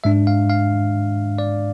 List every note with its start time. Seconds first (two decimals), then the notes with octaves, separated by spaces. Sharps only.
0.04 G#2 G#3 D4 E5
0.27 F5
0.50 F5
1.38 D5